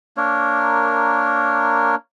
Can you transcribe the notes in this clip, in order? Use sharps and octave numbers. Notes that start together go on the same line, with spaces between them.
A#3 D4 A#4 C#5